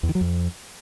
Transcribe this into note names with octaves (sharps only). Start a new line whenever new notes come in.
E2
D#3
F#3
F2